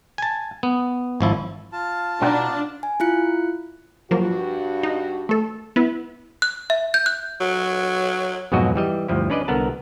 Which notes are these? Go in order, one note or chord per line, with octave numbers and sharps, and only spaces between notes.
G#5 A5
B3
G#1 F3 E4
F4 A5
B2 B3 D4 D#4
G#5
E4 F4 F#6 C#7
G2 F3 F#3 A#3 F#4
D#4
A3 A4
B3 E4 B4
F#6
E5
G6
F#6
F#3
F2 G#2 B2 F#3 F#4 D#5
E3 G3 D#5
D2 G2 F3 E4
C#4 D4 B4 D5 D#5
C2 D3 B3 A#4 F#5 A5